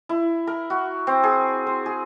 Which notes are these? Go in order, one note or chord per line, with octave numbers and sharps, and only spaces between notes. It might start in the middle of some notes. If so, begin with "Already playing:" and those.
E4
A#4
F#4
C4
G#4
C5
G#4